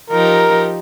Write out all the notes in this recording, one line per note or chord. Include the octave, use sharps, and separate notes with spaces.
F3 D#4 G4 A#4